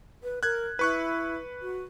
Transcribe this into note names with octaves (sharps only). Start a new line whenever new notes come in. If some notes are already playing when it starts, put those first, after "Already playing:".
B4
A#4 F#6 G#6
E4 B4 C#6 F#6
F#4